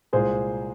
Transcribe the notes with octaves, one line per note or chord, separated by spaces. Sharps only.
C2 A#2 G#3 G#4 C5